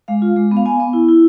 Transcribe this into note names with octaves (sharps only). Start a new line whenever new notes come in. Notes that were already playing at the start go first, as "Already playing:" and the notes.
G#3 F5
F4
G#3
B3
F5
B3 G#5
B3
E4
E4